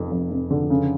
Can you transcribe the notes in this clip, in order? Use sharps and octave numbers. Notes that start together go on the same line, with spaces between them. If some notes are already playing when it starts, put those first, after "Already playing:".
Already playing: F1 F2
F2
F1
D3
C#3